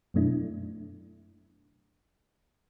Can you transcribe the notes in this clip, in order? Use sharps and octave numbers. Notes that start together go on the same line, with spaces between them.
F#2 B2 F#3 A3 D4 E4